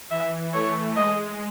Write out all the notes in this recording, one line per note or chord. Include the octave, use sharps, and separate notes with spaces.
E3 E5
A3 C#5
G#3 D#5